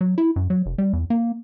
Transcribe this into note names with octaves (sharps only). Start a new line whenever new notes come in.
F#3
E4
F#2
F#3
F1
G3
E2
A#3